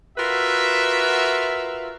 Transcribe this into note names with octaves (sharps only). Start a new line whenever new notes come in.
F4 F#4 A#4 B4 E5